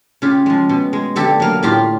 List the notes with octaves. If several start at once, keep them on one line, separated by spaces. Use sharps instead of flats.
C#3 F4 G4
F3 G#3
B2
G#3
D3 G4 A4
F#3 A#3
A2 F4 G4